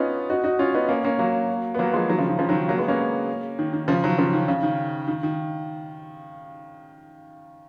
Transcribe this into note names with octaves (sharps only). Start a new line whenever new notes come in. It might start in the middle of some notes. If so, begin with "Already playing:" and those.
Already playing: B3 C#4 D#4 F4
D#4 F#4
D#4 F#4
C#4 F4
B3 D#4
A#3 C#4
A#3 C#4
F#3 A#3
B3
F#3 A#3
F3 G#3
D#3 F#3
C#3 F3
D#3
C#3 F3
D#3 F#3
F#3 A#3
G#3 B3
A#3 C#4
D#3
D#3
C#3 F3
D#3 F#3
C#3 F3
D#3
C#3
D#3
D#3
D#3